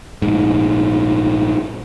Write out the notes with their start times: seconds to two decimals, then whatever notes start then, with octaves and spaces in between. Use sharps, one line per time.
0.22 A#1 G#2